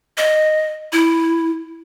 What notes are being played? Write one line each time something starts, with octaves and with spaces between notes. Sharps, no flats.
D#5
E4